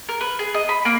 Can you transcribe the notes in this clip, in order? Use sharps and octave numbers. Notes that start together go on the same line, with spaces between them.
A#4
B4
G#4
D#5
B5
A#3